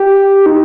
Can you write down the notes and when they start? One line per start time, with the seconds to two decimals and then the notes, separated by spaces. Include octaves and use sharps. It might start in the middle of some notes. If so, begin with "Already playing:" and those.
Already playing: G4
0.46 D#4